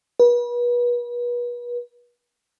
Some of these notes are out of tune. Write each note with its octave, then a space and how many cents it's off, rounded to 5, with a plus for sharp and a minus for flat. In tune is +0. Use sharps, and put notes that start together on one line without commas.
B4 -35